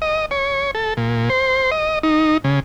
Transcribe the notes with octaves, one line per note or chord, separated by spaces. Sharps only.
D#5
C#5
A4
A#2
C5
D#5
D#4
C#3